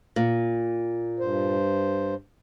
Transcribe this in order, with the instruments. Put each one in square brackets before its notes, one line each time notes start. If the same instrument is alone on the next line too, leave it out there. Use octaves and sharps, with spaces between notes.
[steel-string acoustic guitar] A#2
[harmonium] G2 C5